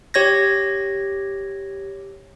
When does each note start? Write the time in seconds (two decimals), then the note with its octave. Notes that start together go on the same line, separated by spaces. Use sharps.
0.14 G4 C#5 G#6 A#6